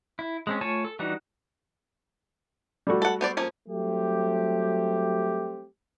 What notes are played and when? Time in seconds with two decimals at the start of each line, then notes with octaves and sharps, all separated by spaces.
0.19 E4
0.47 G#3 C4 C#4
0.61 A3 F4 C#5 G#5 A5
0.85 A4
0.99 E3 G3 D4 D#4 F#4
2.87 G3 A3 F#4
3.02 A4 F#5
3.21 B3 C5 D5
3.37 F3 A#3 C#4
3.69 F#3 G3 A3 C4 G4